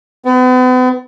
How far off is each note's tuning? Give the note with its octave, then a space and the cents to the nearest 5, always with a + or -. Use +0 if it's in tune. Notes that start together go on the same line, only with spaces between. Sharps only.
B3 +40